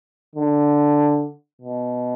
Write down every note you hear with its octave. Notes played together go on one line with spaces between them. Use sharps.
D3
B2